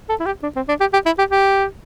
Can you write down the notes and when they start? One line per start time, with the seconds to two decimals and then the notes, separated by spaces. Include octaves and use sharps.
0.09 A4
0.20 E4
0.26 G4
0.43 D4
0.56 C4
0.69 D4
0.80 G4
0.93 G4
1.06 E4
1.19 G4
1.31 G4